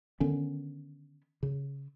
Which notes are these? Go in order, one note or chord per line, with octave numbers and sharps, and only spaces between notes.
D3 D#3 B3 C#4
C#3